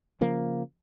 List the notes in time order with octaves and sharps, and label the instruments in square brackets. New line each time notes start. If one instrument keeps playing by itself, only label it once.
[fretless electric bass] C#3 F3 A#3